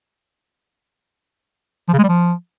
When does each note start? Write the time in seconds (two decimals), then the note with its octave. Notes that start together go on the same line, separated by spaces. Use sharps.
1.88 F3
1.93 C#3
1.98 G#3
2.03 G3
2.09 F3